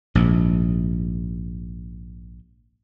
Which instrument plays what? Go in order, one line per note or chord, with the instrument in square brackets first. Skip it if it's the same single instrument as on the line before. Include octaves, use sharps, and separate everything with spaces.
[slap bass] A#1 G#2